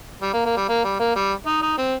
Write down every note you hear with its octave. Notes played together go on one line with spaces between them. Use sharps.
G3
A#3
A#3
G3
A#3
G3
A#3
G3
D#4
D#4
C4